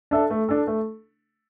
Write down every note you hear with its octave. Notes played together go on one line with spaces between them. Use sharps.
D4 A4 E5
A3
D4 A4
A3